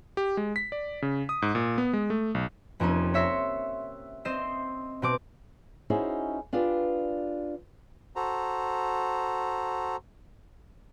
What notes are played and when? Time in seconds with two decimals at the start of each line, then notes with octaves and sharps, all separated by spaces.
0.17 G4
0.37 G#3
0.56 B6
0.72 D5
1.02 C#3
1.29 D#6
1.42 G#2
1.55 A#2
1.78 B3
1.93 G#3
2.10 A3
2.35 B1
2.80 F1 F2 A#3 C#4 D#7
3.14 C#5 E5 C6 A#6 C#7
4.25 C4 C5 D#5 C7 E7
5.02 B2 C4 D6
5.90 C#4 D#4 E4 F#4 G#4 C5
6.53 D4 F4 G4 G#4 B4 D5
8.16 F#4 A4 C5 A#5